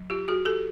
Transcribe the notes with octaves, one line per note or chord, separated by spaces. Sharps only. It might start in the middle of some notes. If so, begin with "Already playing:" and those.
Already playing: F#3
F4 G4
F#4 G#4
G4 A4